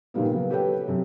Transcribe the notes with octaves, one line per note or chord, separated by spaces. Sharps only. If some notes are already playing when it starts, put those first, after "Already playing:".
A#2 D#3 F3 G3 A#3 B3
C#3 F#3 B3
G4 A4 B4 C#5 G5
F#2 C3